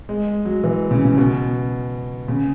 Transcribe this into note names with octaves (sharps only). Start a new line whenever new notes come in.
G#3
F#3
E3
C#3
C#3
B2
C#3